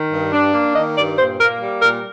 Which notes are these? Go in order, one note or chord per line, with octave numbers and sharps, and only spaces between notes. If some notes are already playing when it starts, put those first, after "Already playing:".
Already playing: D#3
G2
D4
A#3
D#3 D#5
G2 D5
A#2 C5
A#3 A#4
G3
A#2 A#4